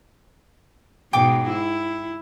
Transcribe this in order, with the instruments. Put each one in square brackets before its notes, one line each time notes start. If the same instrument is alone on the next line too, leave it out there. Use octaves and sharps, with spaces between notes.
[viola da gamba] G#2 B2 [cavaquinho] G5 D6
[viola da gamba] E4